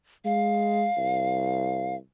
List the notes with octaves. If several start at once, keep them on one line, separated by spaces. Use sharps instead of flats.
G#3 F5
C2